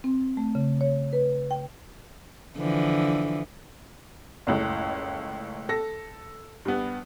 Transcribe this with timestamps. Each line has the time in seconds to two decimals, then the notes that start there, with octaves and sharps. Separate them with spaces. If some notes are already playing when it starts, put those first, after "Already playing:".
0.04 C4
0.37 A3
0.55 C#3
0.81 C#5
1.13 B4
1.51 G5
2.57 D3 E3 F3
4.47 F#1 C#2 A2
5.69 A4 A#6
6.65 G2 B3